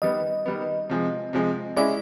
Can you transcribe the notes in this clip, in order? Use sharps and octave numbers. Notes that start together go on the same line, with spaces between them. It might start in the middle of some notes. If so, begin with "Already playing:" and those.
D#3 G3 B3 D#5
D#3 G3 B3
C3 F3 G#3
C3 F3 G#3
G#3 C#4 E4 D5